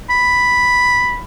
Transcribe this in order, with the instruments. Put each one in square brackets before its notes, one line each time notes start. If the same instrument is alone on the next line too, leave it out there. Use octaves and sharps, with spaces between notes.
[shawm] B5